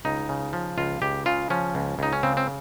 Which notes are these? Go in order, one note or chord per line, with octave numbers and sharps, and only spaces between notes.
C#2 D#4
C#3
F3
C#2 F4
C#2 G4
C#3 F4
F3 C#4
C#2
C#2 D#4
C#4
C#3 C4
C4